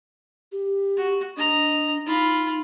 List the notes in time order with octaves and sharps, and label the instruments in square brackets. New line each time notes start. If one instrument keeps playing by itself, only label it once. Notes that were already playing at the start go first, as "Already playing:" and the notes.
[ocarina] G4
[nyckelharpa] F#4
[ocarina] D4 [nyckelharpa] D#5 A#5
[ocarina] D#4 [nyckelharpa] F4 B5